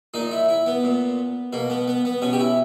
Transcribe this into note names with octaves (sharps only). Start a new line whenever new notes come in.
A#2 D#4
E4
E4
B3
A#2
B2 A#3
B3
B3
B3
B2 C#4
G4
E4